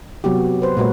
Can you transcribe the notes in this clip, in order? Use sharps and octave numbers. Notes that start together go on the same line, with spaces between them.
C3 F#3 B3 F#4 G4
B4 C5
A#2 G#3 F#4 A#4 B4 C#5